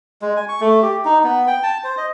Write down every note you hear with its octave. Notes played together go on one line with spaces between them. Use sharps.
G#3
G#5
C#6
A3
G4
D#4
B3
G5
A5
C5
D#5